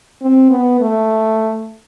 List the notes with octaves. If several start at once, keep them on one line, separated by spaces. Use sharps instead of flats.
C4
B3
A3